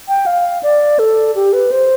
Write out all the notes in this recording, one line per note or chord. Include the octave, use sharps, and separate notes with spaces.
G5
F5
D5
A4
G4
B4
C5